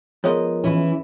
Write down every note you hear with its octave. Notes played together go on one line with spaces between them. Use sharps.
F3 G#3 B3 G#4 A#4 C#5 D#5
E3 C#4 E4